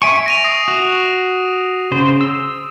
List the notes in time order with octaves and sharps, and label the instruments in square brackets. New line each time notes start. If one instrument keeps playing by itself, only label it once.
[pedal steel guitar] E5 G#5 C#6 [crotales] D7
[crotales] A#6 D#7 F7
D#6 A#6 C7
[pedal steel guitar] F#4
C#3 C5
E6